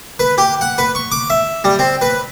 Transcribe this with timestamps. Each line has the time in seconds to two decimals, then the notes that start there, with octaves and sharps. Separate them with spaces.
0.19 B4
0.38 G4
0.61 F#5
0.78 B4
0.95 C#6
1.12 D6
1.30 E5
1.64 G3
1.79 C4
2.01 B4